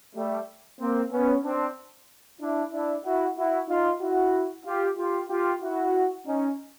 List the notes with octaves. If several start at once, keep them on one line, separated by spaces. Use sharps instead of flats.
G3 A3
A#3 C4
B3 C#4
C4 D4
D4 E4
D4 E4
E4 F#4
E4 F#4
D#4 F4
E4 F#4
F4 G4
F4 G4
F4 G4
E4 F#4
C#4 D#4